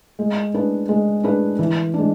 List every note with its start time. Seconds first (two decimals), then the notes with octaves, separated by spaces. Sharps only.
0.19 G#3
0.54 D4 G#4 B4
0.89 G#3
1.23 D4 G#4 B4
1.59 E3
1.94 G#3 D4